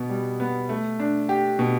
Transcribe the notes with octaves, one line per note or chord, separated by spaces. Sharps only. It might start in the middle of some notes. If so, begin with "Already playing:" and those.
Already playing: B2 B3
G3
B3
A3
D4
G4
B2